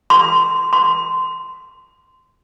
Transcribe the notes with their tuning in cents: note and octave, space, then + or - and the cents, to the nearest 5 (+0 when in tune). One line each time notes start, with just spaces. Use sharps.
C6 -20
C6 -15